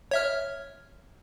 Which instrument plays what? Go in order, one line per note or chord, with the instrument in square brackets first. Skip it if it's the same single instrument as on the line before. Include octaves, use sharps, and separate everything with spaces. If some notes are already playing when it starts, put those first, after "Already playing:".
[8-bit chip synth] C#5 E5 F6